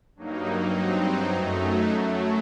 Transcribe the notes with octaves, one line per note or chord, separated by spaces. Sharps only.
G2 F#3 A#3 D#4
G2 F#3 C4 D#4
F#2 F#3 A3 D#4
F#2 F#3 A3